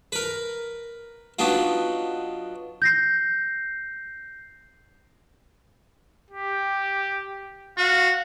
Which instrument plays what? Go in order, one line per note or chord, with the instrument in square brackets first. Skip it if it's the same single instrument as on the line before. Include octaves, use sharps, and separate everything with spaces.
[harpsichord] A#4 B4
F#3 B3 D4 D#4 F4
[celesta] G6 A#6 C7
[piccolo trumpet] G4
[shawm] F#4 [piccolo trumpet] F5